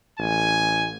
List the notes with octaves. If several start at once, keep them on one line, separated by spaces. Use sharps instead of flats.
A1 G#5